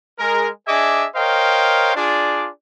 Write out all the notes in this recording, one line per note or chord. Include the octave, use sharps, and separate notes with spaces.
G#3 A#4
D4 G#4 D#5 E5 G#5 D6
A#4 C5 C#5 D#5 F5 G5
D4 F4 G#4 D5